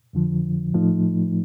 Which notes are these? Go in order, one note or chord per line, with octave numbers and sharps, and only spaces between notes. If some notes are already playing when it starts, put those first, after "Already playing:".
F2 D3 F3
A2 F3 A3 D#4